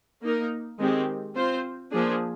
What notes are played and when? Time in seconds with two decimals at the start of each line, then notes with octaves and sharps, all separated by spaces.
0.23 A#3 D#4 A#4
0.80 D#3 G#3 C4 G4
1.36 C4 F4 C5
1.92 F3 A#3 D4 G#4